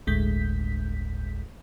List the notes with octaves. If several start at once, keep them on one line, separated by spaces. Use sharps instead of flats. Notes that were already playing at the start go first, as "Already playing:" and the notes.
G1 D2 A2 G#3 G6 B6